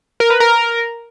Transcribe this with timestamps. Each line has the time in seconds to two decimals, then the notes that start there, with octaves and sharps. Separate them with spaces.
0.20 A#4
0.30 B4
0.40 A#4